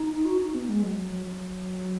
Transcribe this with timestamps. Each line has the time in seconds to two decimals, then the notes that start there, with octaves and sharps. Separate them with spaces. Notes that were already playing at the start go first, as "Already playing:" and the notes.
Already playing: D#4
0.25 F#4
0.40 D#4
0.54 B3
0.69 G#3
0.82 F#3
0.97 F#3
1.11 F#3
1.26 F#3